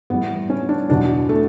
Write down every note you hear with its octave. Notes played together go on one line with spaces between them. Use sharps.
A2 E3 G3 B3
C#4
D4
E2 B2 F#3 D4
A3